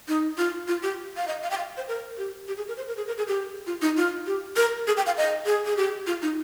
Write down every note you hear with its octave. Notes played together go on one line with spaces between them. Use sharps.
D#4
F4
F4
G4
F5
D#5
F5
G5
F5
C5
A#4
G4
G4
G#4
A#4
C5
A#4
G#4
A#4
G#4
G4
F4
D#4
F4
G4
A#4
G#4
G5
F5
D#5
G#4
G#4
G4
F4
D#4